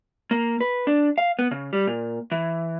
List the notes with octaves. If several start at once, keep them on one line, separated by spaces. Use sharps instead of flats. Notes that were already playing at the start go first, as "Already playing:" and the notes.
A#3
B4
D4
F5
B3
C#3
G3
A#2
E3